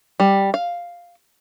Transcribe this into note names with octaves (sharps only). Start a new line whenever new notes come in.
G3
F5